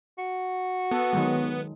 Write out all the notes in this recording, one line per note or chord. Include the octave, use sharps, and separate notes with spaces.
F#4
B3 A4
D#3 F#3 G#3